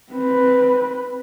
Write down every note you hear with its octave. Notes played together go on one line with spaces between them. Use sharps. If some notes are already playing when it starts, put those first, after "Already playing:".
C4 B4